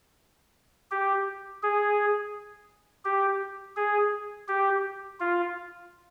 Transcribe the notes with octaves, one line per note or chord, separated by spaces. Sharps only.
G4
G#4
G4
G#4
G4
F4